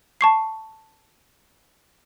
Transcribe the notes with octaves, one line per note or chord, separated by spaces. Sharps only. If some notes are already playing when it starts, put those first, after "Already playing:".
A5 C#6 C7